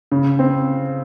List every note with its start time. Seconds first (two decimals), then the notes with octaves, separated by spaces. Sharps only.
0.12 C#3
0.39 C4